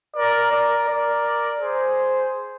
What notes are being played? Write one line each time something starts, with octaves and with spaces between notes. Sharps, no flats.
A#4 D5
A#4 D5
A#4 D5
G#4 C5